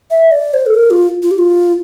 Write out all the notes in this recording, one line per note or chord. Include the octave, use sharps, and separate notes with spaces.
E5
D5
C5
A4
A#4
F4
F4
G4
F4